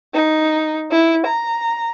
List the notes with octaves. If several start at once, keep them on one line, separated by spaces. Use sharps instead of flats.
D#4
E4
A#5